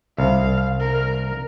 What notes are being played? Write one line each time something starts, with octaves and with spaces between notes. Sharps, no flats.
C2 F5
A#4